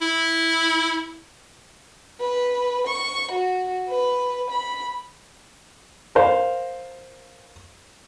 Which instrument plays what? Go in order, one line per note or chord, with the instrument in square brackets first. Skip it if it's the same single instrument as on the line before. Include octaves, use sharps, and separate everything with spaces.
[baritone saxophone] E4
[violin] B4
C#6
F#4
B4
B5
[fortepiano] A#4 C5 F5